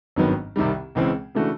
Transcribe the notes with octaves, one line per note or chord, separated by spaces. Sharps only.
G#1 G2 D#3 F#3 B3
C2 C3 D#3 G3
C#2 C#3 E3 G#3 C4
C#3 E3 A3 D4 F#4